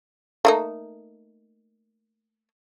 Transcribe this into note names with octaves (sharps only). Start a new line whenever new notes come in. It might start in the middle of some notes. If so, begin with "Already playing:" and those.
A3 A#3 D#4